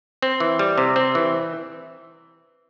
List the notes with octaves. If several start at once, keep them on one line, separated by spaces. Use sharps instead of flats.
C4
E3
G3
C3
C4
E3